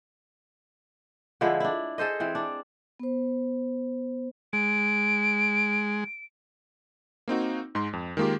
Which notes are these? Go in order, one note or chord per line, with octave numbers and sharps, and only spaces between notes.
D3 F3 G#3 E4
D4 E4
G#4 A4 C5 D#5
E3 C4
D4
B3 C5
G#3 D7
A#3 C4 D#4 F#4
G#2 G#3 C6
F2
D#3 G#3 A#3 F4 G4